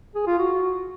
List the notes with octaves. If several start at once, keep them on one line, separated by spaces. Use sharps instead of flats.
G#4
F4
F#4